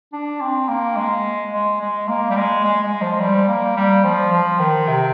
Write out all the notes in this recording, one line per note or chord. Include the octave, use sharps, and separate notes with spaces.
D4
C4
A#3
G#3
G#3
G#3
A#3
G3
G#3
G#3
G#3
F3
G3
A#3
G3
F3
F3
D#3
C3